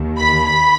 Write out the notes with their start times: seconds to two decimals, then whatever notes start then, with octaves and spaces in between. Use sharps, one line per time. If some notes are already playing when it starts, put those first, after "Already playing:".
Already playing: D#2 D#3
0.17 B5
0.46 B5